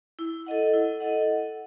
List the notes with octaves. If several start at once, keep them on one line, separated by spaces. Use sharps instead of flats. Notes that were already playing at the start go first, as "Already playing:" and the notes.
E4
A4 D#5 F#5
E4
A4 D#5 F#5